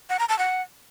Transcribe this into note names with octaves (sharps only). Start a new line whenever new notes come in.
F#5
A#5
A5
F#5